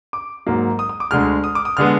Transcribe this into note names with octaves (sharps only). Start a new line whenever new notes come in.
D6
G#2 F#3 A#3
D#6
D#6
D6
D2 D3 G#3 F6
D#6
D6
D#6
D3 G#3 B3 F6